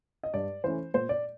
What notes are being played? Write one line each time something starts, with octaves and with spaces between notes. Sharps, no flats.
D#5
G2 D5
E3 A3 C#4 C5
A#2 C5
D5